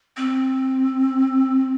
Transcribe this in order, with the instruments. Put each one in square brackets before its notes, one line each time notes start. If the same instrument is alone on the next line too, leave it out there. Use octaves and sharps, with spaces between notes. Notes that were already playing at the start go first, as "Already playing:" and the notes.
[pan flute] C4